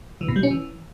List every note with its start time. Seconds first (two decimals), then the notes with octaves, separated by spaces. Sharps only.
0.21 E3
0.28 B2
0.36 G3
0.43 C#4
0.51 E3